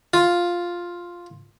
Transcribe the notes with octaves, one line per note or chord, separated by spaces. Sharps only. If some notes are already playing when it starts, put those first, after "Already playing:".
F4